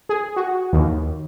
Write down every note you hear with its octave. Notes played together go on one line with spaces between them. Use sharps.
G#4
F#4
D#2